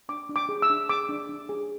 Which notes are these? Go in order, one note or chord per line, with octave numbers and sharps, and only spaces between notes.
D4 D6
D4
D6
G#4
E6
D4
G#4 D6
D4
D4
G#4